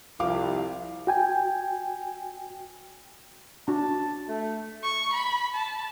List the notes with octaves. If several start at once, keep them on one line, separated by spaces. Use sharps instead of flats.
C2 F3 F5 D6
F#4 G5 G#5
D4 F#4 A5
A3
C#6
B5
A5